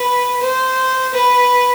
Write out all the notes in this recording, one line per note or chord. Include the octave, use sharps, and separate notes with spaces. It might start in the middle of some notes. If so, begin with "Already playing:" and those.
Already playing: B4
C5
B4